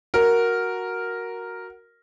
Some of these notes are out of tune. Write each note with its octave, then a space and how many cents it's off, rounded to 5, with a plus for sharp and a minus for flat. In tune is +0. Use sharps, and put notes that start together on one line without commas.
F#4 +0 A#4 +0